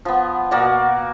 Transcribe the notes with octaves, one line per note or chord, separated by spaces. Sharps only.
F3 B3
B2 A#3 F#4 D5